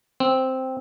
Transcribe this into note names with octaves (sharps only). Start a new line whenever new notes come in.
C4